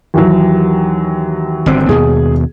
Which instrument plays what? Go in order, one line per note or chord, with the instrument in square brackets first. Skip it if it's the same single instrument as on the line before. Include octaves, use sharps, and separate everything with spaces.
[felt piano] D#2 E3 F#3
[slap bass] G1 D3 C4
[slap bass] D#2 B2 [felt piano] G#4